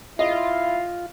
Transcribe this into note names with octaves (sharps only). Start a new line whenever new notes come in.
E4 F4 D#5 F5